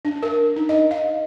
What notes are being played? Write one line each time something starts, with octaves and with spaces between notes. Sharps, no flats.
D4
A#4
D#4
D#5
F5